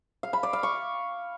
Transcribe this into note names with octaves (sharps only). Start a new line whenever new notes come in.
F5
B5
D5
F5
C#6